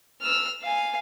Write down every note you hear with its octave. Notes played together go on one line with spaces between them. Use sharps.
E6 F6
F5 G#5